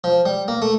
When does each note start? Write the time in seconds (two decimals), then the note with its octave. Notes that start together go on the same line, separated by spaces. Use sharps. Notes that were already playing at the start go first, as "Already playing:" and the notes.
0.04 F3
0.26 G3
0.48 A#3
0.62 A3